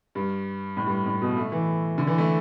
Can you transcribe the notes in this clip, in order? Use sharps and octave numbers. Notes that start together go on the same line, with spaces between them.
G2
A2
G2
A2
B2
A3
E3
D3
E3
A3